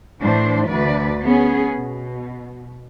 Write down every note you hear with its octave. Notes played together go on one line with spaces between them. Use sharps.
A2 E3 D4 C5
D2 B4 D5
B3 C#4 G#4
B2